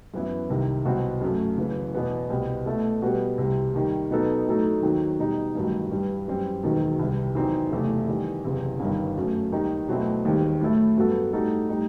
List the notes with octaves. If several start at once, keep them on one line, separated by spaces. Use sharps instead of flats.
F#2 E3 B3 E4
C2 C3 D#3
C2 B2 F#3 C4 F#4
F#2 F#3 A3
F#1 F#2 E3
E2 B2 F#3 B3
C2 B2 G3 C4
B2 A3 E4 A4
B2 G3 B3 F#4
C2 C3 E3 G3
D#2 D#3 G3
B2 F#3 B3 D#4 A4
A2 F#3 A3 D#4 A4
D#2 D#3 F#3 C4
B2 G3 D#4
A1 G2 D#3 F#3
G2 E3 G3
F#2 E3 G3 C4
E1 D#2 D#3 F#3
C2 C3 E3 G3
E2 D#3 F#3 C4 D#4
F#1 E2 C3 E3 A3
E2 D#3 G3
F#1 E2 C3
G1 G2 D#3
F#2 F#3 A3
D#2 D#3 G3 D#4
B2 F#3 A3 C4 E4
E1 D#2 D#3 G3 C4
A2 F#3 A3 E4 A4
G2 F#3 B3 F#4 A4
A2 G3 D#4 F#4 A4
A2 G3 D#4